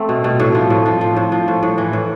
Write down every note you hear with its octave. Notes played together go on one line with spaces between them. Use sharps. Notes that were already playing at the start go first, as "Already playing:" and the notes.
Already playing: A3 C4
B2
B2
A2
F3
A2
F3
F3
A2
F3
A2
A2
E3
A2